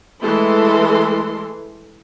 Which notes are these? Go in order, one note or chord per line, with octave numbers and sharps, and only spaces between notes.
E3 G#3 A3 A4 C6